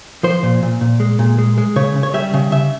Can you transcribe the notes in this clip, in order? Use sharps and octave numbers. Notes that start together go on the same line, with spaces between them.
F3 C5
A#2
A#2
A#2
G#3
A#2
G#3
G#3
C#3 C#5
C#3
C#5
G3 E5
C#3
C#3 E5